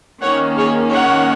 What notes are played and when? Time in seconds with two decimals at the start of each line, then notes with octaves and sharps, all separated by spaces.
0.22 D#3 A#3 C#4 C#5 F#5
0.57 G#4 C#5
0.91 C#5 F#5